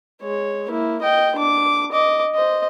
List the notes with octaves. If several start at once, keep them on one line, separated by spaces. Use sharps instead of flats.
G#3 C#5
A#3 E4
D#5 G5
D4 D6
D#5 D6
C5 D#5